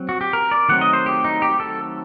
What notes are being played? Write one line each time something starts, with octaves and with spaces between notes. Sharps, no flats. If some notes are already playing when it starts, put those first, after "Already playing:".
Already playing: F#3 C4
F#4
G4
A#4
D5
D#3 F#3 A3 C4 F#5
D#5
C5
G4
D#4
G4
A4